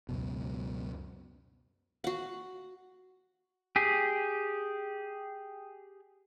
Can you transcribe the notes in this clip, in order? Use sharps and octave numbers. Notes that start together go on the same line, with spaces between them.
C#2 F#2 B2
F#4 F#5
G4 G#4